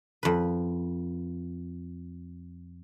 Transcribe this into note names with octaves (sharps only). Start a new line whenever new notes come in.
F2 B4